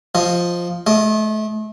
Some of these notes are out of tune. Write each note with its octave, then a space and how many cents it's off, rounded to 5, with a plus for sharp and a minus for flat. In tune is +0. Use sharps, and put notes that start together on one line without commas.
F3 +0 D#5 +0
A3 -35 D#5 +0